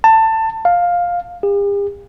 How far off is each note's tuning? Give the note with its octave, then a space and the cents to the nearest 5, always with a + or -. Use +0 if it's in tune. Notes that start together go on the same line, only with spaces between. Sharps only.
A5 +20
F5 +10
G4 +45